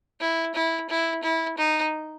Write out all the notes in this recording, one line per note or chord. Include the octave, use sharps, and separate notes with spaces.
E4
E4
E4
E4
D#4